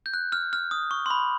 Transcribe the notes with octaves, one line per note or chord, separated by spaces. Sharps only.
G6
F#6
F6
F6
D#6
C#6
C6
B5